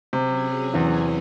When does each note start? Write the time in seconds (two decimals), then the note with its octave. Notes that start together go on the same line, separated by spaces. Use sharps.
0.13 C3 F#3 C#4 G#4
0.74 E2 E3